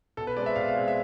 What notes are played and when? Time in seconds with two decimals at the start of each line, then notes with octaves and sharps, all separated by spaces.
0.17 B2 A4
0.27 B4
0.37 G#3 C4 D5
0.46 E5
0.56 B2 F5
0.68 F5
0.75 G#3 C4
0.88 E5